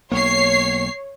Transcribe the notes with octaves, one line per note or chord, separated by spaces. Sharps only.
B1 A#3 C#5 C7